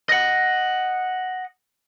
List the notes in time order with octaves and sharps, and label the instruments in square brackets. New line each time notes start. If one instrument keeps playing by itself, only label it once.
[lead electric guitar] D#5 F#5